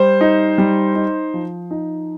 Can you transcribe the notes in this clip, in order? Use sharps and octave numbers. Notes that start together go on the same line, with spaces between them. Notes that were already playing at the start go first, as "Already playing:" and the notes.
Already playing: G3 C5
D#4
G3
D#4
F3
D#4